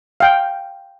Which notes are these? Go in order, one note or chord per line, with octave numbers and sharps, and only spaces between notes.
F5 G5